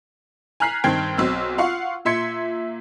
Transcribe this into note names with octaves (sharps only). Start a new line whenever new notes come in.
G#5 A#5 F6 F#6 B6 C7
G2 D#3 C4 G5 G#6 C7
B1 C4 E6
F4 F5 F#5 C#6
A#2 E5 C6 G#6 C#7